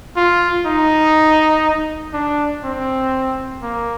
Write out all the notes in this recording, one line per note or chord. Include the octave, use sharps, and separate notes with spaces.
F4
D#4
D4
C4
A#3